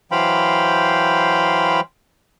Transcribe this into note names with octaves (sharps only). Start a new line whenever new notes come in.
E3 F#3 C5 F5 G5 B5